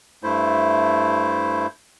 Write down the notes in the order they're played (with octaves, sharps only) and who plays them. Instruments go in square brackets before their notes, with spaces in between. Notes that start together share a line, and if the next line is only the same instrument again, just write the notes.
[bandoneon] G2 A3 E4 C5